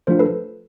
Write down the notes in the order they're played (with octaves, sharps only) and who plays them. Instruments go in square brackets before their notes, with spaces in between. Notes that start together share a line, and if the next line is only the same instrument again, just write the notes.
[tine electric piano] F3 A3 D4 F4 [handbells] A#4 C5
[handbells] A4 B4